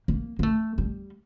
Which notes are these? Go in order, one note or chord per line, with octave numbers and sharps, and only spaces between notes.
A#3
A#3
A3
G3